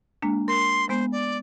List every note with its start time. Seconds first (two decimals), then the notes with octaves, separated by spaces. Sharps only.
0.22 G#3 A#3 D4
0.48 A#4 C6
0.89 G#3 B3 C5
1.12 D5